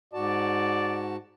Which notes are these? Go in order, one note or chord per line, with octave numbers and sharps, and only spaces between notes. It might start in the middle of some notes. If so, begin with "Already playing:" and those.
G#2 F#4 D5 A5